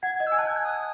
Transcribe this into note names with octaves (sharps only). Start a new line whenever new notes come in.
F#5 G#6
G#6
D#5
E6
G#5
A5 F#6
G#6
F#6
D#6